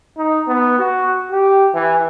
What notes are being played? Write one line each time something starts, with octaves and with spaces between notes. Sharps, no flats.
D#4
B3
F#4
G4
E3